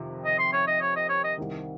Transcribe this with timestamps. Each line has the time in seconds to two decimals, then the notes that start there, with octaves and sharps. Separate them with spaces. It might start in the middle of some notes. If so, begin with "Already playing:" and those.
Already playing: F2 C3 D#3
0.25 D#5
0.39 C6
0.53 C#5
0.67 D#5
0.81 C#5
0.96 D#5
1.09 C#5
1.24 D#5
1.38 C2 C3 D#3